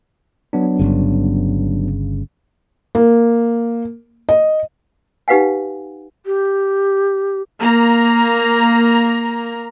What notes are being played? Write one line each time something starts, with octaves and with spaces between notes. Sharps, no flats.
F#3 B3 D4
G1 G2 C#3
A#3
D#5
D#4 G4 B4 F5 F#5 G#5
G4
A#3 A#5